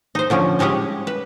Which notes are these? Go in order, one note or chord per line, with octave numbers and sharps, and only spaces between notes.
D#4 C5
D3 F3 C#4 D4
G3 G#3 C#4 G4 G#4
B4